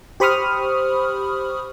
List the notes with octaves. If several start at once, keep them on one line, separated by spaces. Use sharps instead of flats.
G4 C5 B5 C#6 D#6 F6